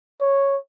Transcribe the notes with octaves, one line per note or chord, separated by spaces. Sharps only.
C#5